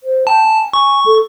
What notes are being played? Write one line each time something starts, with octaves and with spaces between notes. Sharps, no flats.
C5
G5 A5
G#5
G#5 C#6
A4